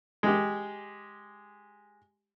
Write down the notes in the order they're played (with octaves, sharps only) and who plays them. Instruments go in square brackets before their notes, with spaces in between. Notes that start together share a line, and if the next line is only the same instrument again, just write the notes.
[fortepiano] G#3 G4